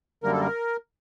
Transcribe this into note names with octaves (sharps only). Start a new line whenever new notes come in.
F#2 D3 G3 A#3 A#4
A4
A#4